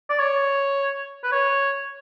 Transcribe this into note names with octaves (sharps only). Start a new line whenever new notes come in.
D5
C#5
B4
C#5